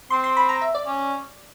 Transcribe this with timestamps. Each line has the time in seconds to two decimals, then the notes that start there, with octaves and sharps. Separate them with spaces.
0.10 C4 C6
0.24 C6
0.37 B5
0.49 A#5
0.61 E5
0.75 D5
0.86 C#4